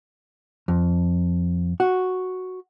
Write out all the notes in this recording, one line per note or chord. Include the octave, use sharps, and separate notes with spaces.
F2
F#4